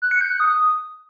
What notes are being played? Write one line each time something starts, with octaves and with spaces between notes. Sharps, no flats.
F#6
C#7
G6
F#6
D#6